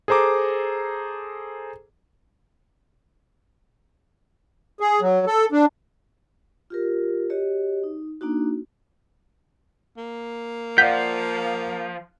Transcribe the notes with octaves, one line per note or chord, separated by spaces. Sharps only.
G#4 A4 C5 A#5 D6
G#4
F#3
A4
D4
F4 G4 A#4
F#4 G4 C#5 D#5
D#4
A#3 D4 D#4 F#4
A#3
F3 D5 F5 F#5 G6 B6